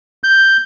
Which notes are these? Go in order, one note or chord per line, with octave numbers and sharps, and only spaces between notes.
G6